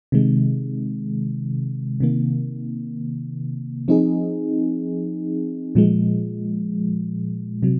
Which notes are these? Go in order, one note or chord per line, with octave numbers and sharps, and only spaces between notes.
C3 D#3 G#3
C3 D#3 A#3
F3 C4 D#4 G#4
A#2 F3 G#3
C3 F#3